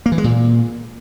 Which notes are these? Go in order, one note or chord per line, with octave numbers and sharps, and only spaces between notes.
A#3
E3
G#3
A#2